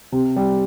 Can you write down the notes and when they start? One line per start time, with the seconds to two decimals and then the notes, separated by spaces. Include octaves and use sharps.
0.12 C3
0.36 G3